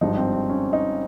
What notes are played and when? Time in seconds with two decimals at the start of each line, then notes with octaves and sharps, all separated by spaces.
0.01 G#1 G2 F3 D#4
0.17 C4
0.33 C4
0.50 C#4
0.73 D#4